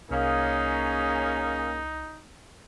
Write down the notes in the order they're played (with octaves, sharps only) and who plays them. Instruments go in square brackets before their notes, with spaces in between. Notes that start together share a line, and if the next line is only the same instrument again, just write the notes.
[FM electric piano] C2 [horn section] A#3 C#4 G#4 [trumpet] D#4